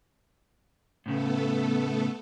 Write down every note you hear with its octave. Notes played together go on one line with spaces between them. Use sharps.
A2 C#3 A3 B3 A4